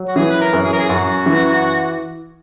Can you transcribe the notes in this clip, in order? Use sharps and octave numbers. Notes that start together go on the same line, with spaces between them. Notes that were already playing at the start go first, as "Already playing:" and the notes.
Already playing: F#3
F#4
E3 G#4
B4
A#4
F#2
G#4
A#4
G#4
F#2 F#4
E3